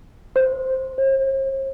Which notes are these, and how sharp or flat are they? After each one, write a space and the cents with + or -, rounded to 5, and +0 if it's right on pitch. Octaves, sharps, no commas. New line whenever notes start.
C5 +0
C5 +45